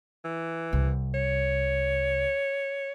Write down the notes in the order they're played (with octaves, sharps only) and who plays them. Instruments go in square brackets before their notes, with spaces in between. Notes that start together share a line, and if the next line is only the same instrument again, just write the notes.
[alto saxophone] E3
[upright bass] C2
[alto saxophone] C#5